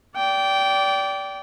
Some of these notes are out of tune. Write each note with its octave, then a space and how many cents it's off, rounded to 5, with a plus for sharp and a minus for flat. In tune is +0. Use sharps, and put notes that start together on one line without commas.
D5 -25 G5 -15